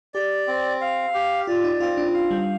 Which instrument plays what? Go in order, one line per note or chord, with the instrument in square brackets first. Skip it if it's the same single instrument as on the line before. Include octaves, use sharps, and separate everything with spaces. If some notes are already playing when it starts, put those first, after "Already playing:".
[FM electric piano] G4 [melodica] D5
[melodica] C4
F5
G4
[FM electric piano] F4 [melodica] D5
[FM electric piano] D#4
[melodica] C4 [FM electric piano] F4
[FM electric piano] D4
[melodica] F5
[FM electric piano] G3